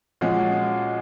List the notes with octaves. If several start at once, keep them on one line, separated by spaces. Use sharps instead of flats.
A#2 F3 G#3 C#4 F#4